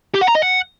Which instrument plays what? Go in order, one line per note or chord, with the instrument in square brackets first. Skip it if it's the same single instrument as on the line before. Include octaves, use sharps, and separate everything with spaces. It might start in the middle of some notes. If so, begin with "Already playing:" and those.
[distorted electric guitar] G4
F#5
A#5
D#5
F#5